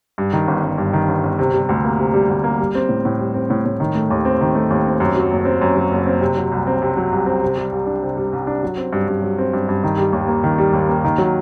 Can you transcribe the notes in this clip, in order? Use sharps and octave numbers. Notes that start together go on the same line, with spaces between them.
G2
D#3
G1
G1
G2
D#3
G1
G1
C3
G3
D2
A#3
C3
G3
D2
A#3
G3
C4
A2
A2
G3
C4
A2
A2
D#3
A3
D#2
C4
D#3
A3
D#2
C4
F#2
F#3
F#1
C4
F#2
F#3
F#1
C4
C3
F#3
C2
C4
C3
F#3
C2
C4
C3
G3
C2
D4
C3
G3
C2
D4
F#3
C4
G2
G2
F#3
C4
G2
G2
D#3
G3
D#2
A#3
D#3
G3
D#2
A#3
D#3
F#3